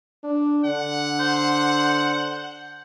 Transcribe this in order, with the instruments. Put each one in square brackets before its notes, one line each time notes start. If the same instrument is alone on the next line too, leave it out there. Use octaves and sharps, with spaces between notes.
[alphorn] D4
[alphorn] D3 [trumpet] F#5
[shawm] C5